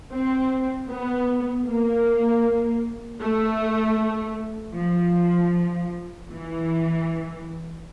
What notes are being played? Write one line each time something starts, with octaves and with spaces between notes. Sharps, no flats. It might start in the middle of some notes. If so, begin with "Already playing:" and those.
C4
B3
A#3
A3
F3
E3